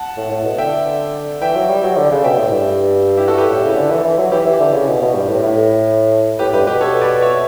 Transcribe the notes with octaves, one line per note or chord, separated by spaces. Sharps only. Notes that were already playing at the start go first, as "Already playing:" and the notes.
Already playing: F#5 A5
A2
A2
B2
D3 E5 G5
E3 E5 G5
F#3
G3
F#3
D3
C#3
B2 E5 G5
A2
G2
E4 G4
F#4 A4
G4 B4
A2
C#3
D3
E3
E3
F#3
E3 E4 G4
E3
D3
C#3
B2
B2
G2
A2
A2
A2 G4 B4
G2 G4 B4
B2 G4 B4
A4 C#5
B4 D5
C#5 E5